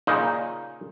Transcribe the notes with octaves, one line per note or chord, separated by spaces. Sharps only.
A#2 C#3 D#4